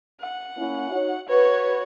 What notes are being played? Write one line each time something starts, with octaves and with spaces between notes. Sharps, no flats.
F#5
A#3 C#4 E4
D#4 F#4 C#5
F#4 B4 C#5